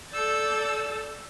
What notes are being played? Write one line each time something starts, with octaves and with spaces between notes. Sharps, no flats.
A4 D5 E6 G6 A6